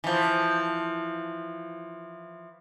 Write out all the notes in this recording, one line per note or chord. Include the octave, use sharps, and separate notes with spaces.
E3 F3